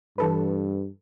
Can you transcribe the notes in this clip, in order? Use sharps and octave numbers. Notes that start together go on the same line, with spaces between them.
G2 E3 A4 B4